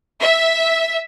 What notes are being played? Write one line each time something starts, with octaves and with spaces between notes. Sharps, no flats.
E5